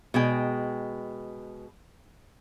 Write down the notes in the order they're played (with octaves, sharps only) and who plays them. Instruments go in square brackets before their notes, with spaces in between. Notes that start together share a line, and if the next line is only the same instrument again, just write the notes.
[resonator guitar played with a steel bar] B2 G#3 G5